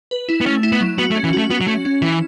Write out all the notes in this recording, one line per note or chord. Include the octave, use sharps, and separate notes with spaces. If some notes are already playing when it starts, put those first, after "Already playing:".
B4
E4
B3
A3 C#4
E4
B3
F#3
B3 F#4
A3
C#4
E3
A3 F#4
B3 F#4
F#3
A3 C#4
C#4
E3 E4